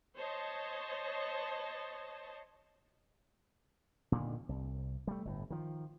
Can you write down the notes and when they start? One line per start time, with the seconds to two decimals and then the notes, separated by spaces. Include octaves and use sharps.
0.16 C5 C#5 D#5 A5
4.12 A#2 D3 D#3
4.49 C2
5.07 G3 A3
5.25 G1 A2
5.50 D#3 F3